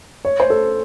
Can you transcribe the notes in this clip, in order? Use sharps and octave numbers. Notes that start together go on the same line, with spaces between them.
C#5
C5
A4